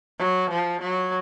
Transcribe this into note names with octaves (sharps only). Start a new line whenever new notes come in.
F#3
F3
F#3